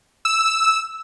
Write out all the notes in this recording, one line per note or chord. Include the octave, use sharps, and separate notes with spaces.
E6